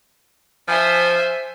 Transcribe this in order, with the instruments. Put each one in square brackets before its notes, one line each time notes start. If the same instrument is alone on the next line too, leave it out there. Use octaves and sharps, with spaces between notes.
[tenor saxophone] F3 [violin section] C5 E5 G#5